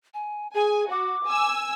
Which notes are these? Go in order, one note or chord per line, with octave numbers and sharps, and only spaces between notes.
G#5
G#4 G#5
F#4 D6
G#5 E6